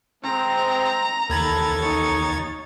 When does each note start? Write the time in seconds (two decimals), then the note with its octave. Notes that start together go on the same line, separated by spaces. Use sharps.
0.24 G#3 C4 A#5
1.30 D#2 A4 B5 G#6 A6
1.79 D#4 C#5